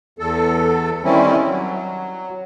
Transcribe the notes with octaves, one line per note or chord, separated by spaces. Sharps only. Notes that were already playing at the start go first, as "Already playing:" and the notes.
E2 A4
D#3 G3 C4 C#4 E4
F#3